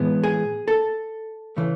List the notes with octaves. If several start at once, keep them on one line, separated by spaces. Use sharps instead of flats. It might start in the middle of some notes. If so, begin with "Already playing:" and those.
Already playing: A2 E3 G#3 B3
G#4
A4
C#3 E3 A3